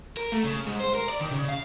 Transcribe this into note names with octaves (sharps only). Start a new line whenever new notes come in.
A#4
A3
C#3
G#2
C5
A#4
D5
D#3
C#3
F5